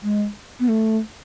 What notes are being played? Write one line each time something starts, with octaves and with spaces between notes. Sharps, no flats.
G#3
B3
A3